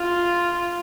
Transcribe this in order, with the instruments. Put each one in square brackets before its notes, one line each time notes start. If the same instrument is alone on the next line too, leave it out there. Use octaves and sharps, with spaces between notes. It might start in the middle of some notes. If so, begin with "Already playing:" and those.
Already playing: [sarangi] F4